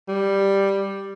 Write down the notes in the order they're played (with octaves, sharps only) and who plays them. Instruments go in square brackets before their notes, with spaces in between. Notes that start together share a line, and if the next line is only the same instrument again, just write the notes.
[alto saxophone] G3